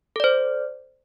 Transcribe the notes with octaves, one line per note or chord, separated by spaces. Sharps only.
A4 C5 D5